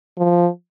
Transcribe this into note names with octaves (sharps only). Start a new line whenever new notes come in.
F3